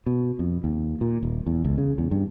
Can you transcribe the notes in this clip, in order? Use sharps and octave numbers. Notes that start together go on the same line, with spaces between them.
B2
F2
D#2
A#2
D#1
E2
C#2
C#3
E2
G2